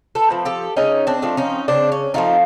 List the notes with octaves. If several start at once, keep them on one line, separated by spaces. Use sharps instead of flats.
A4 B4
F3 A3 C4
G4 A4
C#3 C#4 D#4
C4 D4
F3 A3 C4
C#4 D#4
C#3 C4 D4
C#4
F3 A3 C4 D#4 F4